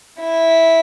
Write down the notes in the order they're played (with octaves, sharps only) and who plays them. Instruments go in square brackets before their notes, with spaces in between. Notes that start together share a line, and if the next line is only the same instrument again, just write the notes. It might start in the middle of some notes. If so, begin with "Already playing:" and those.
[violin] E4